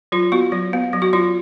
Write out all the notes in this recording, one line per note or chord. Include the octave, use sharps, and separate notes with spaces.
F#3 F4
B3 F#4
F#3
B3
F#3
F#4
F#3 F4